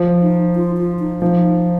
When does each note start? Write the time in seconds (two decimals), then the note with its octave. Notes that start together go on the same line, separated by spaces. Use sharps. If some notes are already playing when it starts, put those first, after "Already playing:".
Already playing: F3
0.22 D#4
0.55 F4
0.77 F4
0.99 D#4
1.22 F3 D#4